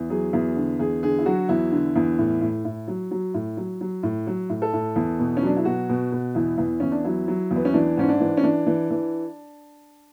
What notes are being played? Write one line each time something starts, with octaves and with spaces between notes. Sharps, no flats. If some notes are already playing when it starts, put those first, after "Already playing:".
Already playing: E2
F#3 G#4
E2
D3
E2 G#4
D3 G#4
E4
F#3 F#4
E2 E4
D3
E2
A2
A2
A2
F#3
F#3
A2
F#3
F#3
A2
F#3
A2
A4
A2
E2
B2
C#4
F#3 D4
E4
B2 F#4
B2
B2
E2 E4
E2
E2 C#4
D4
F#3 E4
F#3
E2
B3
C#4
E3 D4
G#2 C#4
D4
E3
C#4
E3 D4
E3
E3